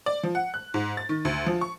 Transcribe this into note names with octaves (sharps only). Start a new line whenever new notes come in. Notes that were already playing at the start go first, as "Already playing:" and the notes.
D5
F3
F#5
F#6
G#2
A6
D#3
D2
F3
C#6